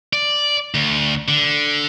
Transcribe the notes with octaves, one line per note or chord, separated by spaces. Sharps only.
D5
D2
D3